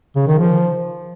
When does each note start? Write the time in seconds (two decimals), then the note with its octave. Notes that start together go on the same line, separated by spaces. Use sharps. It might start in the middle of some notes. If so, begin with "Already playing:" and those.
0.16 C#3
0.28 D#3
0.39 F3